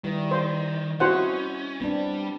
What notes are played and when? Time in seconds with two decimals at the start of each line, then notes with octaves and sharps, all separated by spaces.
0.04 D#3 G3 E4 B4
0.31 C5
1.00 C4 C#4 E4 F#4 C5 D#5 F#5
1.80 G3 B3 C4 D4